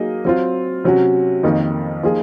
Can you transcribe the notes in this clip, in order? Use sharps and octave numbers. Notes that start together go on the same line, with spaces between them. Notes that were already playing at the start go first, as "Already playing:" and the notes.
Already playing: F#3 A#3 D#4 G#4 D#5
F#3 C4 F4
C3 F#3 C#4 F#4
F2 D#3 A#3 D#4
F3 A#3 D#4 G#4